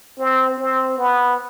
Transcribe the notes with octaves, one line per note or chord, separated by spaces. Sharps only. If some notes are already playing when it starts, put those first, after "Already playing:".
C4
C4
B3